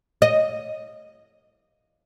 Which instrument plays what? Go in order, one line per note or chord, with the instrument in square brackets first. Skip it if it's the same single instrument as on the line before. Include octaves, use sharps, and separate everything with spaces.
[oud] D#5